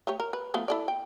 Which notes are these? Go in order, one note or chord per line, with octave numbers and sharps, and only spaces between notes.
A3 G4 C#5
A#4
B4
F3 A3 B3
E4 A4 D5
G5